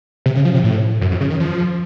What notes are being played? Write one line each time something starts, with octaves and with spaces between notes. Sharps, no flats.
C3
C#3
F3
C3
A2
F#2
F2
C#3
D#3
F3